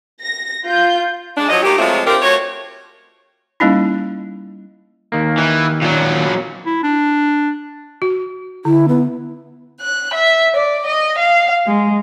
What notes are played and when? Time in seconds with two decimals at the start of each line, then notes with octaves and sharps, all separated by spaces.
0.22 A#6
0.66 F4 G6
1.37 G#3 D4
1.49 F3 F#3 D#5
1.63 A3 A#3 D#4 G4
1.78 F3 F#3 G#3 A3 C4 F4
2.06 C4 D4 F4 G4 A#4
2.22 A3 F4 F#4 C#5
3.60 G3 A#3 C#4 D#4 E4
5.12 D#2 D#3 A#3
5.38 E3
5.81 A#2 F#3
6.66 E4
6.83 D4
8.02 F#4
8.65 D3 E4
8.88 B3
9.81 F#6
10.15 E5
10.56 D5
10.85 D#5
11.18 F5
11.67 G#3